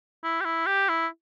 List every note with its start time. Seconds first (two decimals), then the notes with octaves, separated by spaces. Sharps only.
0.24 E4
0.41 G4
0.45 E4
0.66 G4
0.89 E4